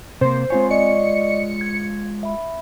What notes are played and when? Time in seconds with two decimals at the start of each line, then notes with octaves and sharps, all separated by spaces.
0.21 C3 A#3 C5
0.50 G#3 C4 F4 C#5 G#5
0.71 D5 D#5 C#6 C#7
1.61 G#6
2.23 E5 B5